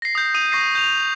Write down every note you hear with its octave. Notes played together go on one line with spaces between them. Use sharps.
A#6 C7
D#6 G6
D#6 D#7
C#6 A#6 C7
G6 F7